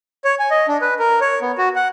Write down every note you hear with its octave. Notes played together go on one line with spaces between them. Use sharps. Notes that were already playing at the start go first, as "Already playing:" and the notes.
C#5
G#5
D#5
D4
B4
A#4
C#5
B3
F#4
F#5